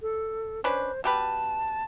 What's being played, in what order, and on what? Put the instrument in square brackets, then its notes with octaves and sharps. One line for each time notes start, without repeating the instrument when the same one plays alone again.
[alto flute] A4
[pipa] C#4 D4 B4 [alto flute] C5
[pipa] B2 G4 B4 [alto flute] A5